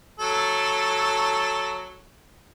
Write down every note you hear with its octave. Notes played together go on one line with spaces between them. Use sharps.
F#3 A4